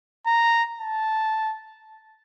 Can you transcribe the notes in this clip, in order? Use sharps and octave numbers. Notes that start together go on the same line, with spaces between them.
A#5
A5